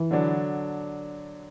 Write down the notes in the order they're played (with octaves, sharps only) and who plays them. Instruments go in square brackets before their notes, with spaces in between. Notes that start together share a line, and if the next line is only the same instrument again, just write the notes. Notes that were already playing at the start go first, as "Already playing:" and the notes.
Already playing: [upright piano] E3
[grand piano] D3 F#3 D4